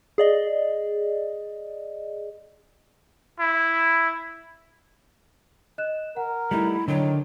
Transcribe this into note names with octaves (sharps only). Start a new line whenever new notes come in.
G#4 D5 D#5
E4
D#5 F#6 E7
A#4 F#5
G3 A3 D#4 E4
D3 D#3 F#3 D4